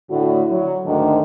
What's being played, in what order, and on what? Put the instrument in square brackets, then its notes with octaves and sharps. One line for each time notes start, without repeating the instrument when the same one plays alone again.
[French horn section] A2 D3 F#4
F#3
D2 G#2 D3 D#3 D4 A4